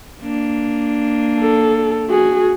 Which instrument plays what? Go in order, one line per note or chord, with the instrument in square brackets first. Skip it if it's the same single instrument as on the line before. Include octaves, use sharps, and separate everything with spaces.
[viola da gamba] A#3 D4
[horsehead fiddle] A4
F#4 G#4